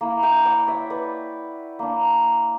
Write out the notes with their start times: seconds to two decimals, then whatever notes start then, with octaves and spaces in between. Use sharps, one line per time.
0.01 A#3 E4
0.23 E5 G5
0.45 D5 F#5
0.67 C#5 E5
0.90 B4 D5
1.79 A#3 D4